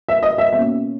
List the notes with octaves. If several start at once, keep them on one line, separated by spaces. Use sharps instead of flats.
E5
D#5
E5
B2 A#3 C#4 E5